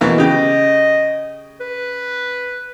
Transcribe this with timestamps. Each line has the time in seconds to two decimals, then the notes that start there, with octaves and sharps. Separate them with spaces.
0.01 B2 E3 A#3
0.18 C#3 G4 D#5
1.60 B4